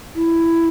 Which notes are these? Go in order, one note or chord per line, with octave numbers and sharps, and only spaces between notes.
E4